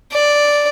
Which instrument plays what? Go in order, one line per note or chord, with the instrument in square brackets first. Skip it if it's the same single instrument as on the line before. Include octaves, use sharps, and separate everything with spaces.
[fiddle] D5